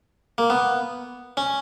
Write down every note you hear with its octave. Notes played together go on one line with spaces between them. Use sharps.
A#3
B3
C#4